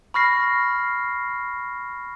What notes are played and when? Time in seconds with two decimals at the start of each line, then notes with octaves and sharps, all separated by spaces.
0.14 B5 C#6 F6 A#6 C7